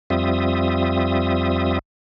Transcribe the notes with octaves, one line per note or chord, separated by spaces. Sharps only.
F2 G3 C4 F4 E5 D#6